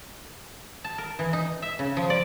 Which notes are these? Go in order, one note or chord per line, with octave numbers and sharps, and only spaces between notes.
A5
A#4
E3
D#4
E5
C#3
F3
D5